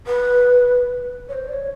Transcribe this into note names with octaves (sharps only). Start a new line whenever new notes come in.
B4
C#5
C5
D5
C#5